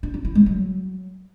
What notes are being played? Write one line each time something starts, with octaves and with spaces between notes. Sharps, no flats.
D4
D4
E4
G#3
F#3